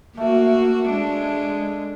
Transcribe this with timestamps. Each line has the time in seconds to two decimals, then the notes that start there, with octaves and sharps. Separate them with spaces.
0.17 A3 A#3 F#4
0.90 G#3 D4